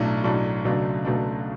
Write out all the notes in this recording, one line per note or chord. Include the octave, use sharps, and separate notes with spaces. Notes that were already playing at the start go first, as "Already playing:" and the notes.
Already playing: B1 A2 F#3 A3 D4
B1 A2 F#3 A3 D4
C#2 B2 F#3 A3 D4
C#2 B2 F#3 A3 D4